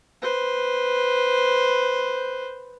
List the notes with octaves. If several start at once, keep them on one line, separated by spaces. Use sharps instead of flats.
B4 C5